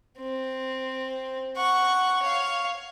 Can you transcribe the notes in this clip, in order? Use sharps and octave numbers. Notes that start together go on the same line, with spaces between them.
C4
F#5 C#6
C#5 F5